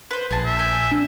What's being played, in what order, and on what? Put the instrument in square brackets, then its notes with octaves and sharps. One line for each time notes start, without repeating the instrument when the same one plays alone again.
[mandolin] B4 C5
[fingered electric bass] A#1 [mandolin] G#4 A5
[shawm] E5
[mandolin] G5 G#5
[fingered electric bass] D4